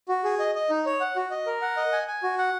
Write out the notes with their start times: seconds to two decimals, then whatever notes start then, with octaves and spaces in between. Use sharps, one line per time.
0.09 F#4
0.24 G#4
0.40 D#5
0.55 D#5
0.70 D#4
0.86 C#5
1.00 F#5
1.16 F#4
1.31 D#5
1.46 A#4
1.62 F#5
1.77 D#5
1.92 G#5
2.08 G#5
2.23 F#4
2.38 F#5